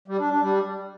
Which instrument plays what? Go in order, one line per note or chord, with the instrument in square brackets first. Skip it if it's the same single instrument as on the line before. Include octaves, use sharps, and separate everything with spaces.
[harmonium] G3
D4
D4
G3